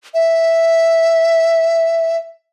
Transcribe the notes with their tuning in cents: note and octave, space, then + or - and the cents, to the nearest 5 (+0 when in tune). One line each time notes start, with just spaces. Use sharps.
E5 +0